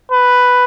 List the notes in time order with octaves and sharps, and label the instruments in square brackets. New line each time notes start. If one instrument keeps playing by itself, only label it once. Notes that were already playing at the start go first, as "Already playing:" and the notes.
[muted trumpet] B4